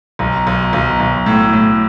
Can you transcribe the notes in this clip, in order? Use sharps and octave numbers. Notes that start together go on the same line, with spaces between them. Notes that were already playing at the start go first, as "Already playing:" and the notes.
B1
B1
B1
B1
A2
A2